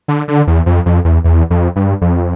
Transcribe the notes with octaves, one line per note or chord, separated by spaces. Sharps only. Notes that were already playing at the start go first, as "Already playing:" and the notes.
D3
D3
E2
F2
F2
E2
E2
F2
G2
F2